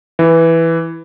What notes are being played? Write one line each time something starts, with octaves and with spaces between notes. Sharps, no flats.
E3